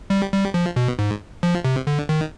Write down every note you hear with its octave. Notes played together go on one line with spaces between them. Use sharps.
G3
G3
F3
B2
G#2
F3
C3
D3
D#3